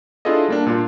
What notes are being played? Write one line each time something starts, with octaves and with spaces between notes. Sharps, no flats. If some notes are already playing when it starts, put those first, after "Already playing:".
D4 E4 F4 G#4 A4 D#5
G3 A#3 D4
A#2 D4 F4